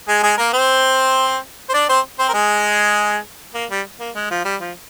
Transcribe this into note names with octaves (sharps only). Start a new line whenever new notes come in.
G#3 G#4
G#3 G#4
A#3 A#4
C4 C5
C5
D4 D5
C4 C5
C4 C5
A#4
G#3 G#4
A#3
G3
A#3
G#3
F3
G3
F3